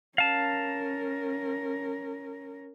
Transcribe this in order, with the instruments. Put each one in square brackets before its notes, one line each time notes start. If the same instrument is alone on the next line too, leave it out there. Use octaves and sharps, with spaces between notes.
[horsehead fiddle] C#4 A#4 [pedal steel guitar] F5 A5